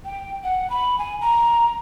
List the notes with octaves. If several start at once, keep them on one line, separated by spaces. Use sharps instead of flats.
G5
F#5
B5
G#5
A#5